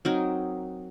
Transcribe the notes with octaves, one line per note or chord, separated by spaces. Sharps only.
F#3 C4 D#4 A#4